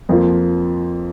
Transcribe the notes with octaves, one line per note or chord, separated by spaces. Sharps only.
F2 F3 A#3 F4